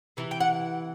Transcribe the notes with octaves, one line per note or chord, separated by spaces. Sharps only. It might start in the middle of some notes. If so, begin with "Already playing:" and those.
C3 E3
G5
F#5